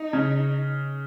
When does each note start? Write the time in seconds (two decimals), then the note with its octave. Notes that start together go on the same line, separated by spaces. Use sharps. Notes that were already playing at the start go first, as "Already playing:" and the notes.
Already playing: D#4
0.13 C#3